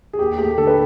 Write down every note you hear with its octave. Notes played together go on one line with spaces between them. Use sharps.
G#4
D#2 G4
A3 G4
D3 A4
B4